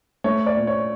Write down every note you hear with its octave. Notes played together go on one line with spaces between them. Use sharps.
A3 C#5
D5
A#2
C#5